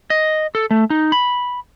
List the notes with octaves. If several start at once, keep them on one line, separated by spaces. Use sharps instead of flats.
D#5
A4
A3
D#4
B5